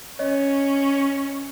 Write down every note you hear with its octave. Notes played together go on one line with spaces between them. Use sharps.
C#4 C#5 D#5